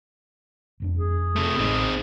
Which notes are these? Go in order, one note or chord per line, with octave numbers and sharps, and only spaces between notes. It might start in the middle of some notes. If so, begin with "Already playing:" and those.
E1 F2 D4
G#4
C3 A3
A1 C4 D#4